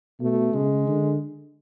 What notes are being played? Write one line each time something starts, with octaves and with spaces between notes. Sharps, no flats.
B2 A3
C#3 G#3
D3